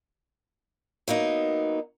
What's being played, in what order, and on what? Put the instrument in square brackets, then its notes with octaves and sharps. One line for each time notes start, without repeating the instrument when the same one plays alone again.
[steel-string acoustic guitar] F#3 A#3 B3 D#4